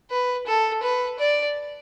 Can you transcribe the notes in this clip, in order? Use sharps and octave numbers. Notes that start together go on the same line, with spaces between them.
B4
A4
B4
D5